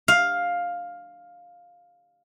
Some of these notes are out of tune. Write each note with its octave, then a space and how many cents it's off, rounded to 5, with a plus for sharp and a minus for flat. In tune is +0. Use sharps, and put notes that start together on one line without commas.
F5 +10